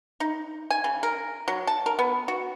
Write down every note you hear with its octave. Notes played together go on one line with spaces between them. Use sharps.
D#4
G#5
C#3
A#4
F#3
A5
A#4
B3
F#4